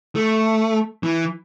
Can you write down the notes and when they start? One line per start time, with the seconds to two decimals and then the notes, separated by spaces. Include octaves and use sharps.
0.15 A3
1.03 E3